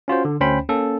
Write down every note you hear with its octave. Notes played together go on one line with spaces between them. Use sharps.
C#4 F4 F#4 C5
D3
D2 C#4 C5 G5 B5
A#3 C#4 A4